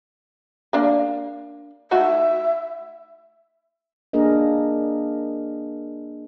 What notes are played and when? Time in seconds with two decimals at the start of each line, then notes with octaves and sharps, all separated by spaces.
0.73 A#3 D4 F5
1.91 A3 D#4 F#4 E5
4.13 A#3 D4 G#4 A#4 D#5